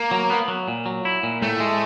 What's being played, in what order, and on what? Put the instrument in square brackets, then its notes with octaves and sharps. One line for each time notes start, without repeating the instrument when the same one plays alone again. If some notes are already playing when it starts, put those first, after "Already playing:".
Already playing: [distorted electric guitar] A#3
[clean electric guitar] F#3
B3
F#3
A#2
F#3
E4
A#2
[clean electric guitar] A2 [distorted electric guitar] A3
[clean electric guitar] G#3